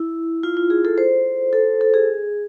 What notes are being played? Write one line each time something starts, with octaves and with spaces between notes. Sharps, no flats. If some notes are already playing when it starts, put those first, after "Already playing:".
Already playing: E4
F4
F4
G#4
A4
C5
A4
A4
G#4